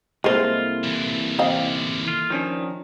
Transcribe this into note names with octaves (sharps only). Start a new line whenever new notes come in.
C2 G#3 A#3 E4 F4 A4 C5
D3 E3
C4 D#5 F5
F4
D#3 F3 C#4 D4